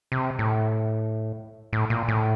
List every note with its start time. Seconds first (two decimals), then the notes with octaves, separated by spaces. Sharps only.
0.12 C3
0.39 A2
1.73 A2
1.90 A#2
2.08 A2